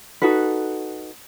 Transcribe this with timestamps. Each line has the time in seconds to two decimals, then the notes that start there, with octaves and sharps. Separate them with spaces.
0.22 D#4 F#4 A4 B4